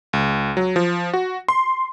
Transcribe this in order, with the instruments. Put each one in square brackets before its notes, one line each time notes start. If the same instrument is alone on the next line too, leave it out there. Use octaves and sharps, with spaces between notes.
[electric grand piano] C#2
F#3
F3
F#4
C6